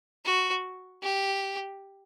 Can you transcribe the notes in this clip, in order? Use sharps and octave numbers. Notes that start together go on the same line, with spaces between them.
F#4
G4